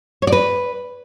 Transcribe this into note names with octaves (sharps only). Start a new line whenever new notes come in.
C#5
D5
B4